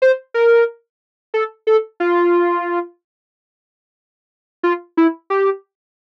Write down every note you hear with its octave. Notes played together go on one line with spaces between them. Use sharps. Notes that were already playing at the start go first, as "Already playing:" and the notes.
C5
A#4
A4
A4
F4
F4
E4
G4